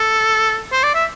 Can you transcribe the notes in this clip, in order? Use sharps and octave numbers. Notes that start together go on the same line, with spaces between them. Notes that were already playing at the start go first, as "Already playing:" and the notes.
Already playing: A4
C5
D5
E5